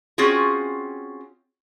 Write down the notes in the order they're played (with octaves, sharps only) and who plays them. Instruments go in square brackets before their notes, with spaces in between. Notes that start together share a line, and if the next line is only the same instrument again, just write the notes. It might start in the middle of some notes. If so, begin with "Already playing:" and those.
[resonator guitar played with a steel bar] C4 C#4 F4 F#4 G#4